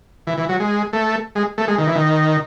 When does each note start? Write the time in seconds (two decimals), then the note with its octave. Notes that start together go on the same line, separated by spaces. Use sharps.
0.27 E3
0.38 E3
0.49 F#3
0.60 G#3
0.93 A3
1.35 G#3
1.58 A3
1.68 G#3
1.78 D#3
1.87 E3
1.96 D#3